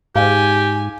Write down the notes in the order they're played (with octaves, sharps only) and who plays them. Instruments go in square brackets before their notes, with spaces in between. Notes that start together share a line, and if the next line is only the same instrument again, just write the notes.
[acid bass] G#2 [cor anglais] G4 [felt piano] F5 [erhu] G#5